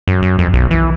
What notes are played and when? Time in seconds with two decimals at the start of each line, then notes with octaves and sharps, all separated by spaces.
0.07 F#2
0.23 F#2
0.39 F2
0.53 B1
0.71 E3